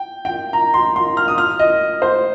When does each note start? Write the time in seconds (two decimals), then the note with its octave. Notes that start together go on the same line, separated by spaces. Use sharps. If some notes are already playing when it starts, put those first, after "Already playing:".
Already playing: G5
0.25 G5
0.53 A#5
0.74 C6
0.96 C6
1.17 F6
1.28 D#6
1.38 F6
1.59 D#5
2.02 C5